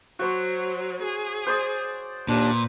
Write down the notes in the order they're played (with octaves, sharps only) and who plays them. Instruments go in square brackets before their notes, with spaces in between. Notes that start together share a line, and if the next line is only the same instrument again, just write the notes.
[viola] F#3 [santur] F#4 C5 C#5
[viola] G#4
[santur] C5 D5 D#6
[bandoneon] D#2 D4 [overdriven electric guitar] A#2 [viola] B4